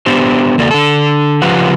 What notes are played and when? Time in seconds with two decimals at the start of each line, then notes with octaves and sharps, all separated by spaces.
0.06 B3 D4 G4 C5
0.58 E2 C#3 A#3 F#4 A4 D5
0.71 D3 A4
1.42 C#3 F3 F4 G4 B4 F#5